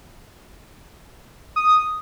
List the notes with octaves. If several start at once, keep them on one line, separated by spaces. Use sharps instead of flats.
D#6